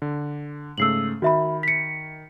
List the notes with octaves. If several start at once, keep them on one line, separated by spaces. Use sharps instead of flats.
D3
G#2 C#3 A3 E6 C7 F#7
D#3 F#4 E5 B5
B6 C#7